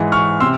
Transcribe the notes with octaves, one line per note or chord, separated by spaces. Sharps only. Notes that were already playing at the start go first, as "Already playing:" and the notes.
Already playing: G#2 E3 G#3
C#6 F6
C3 C6 E6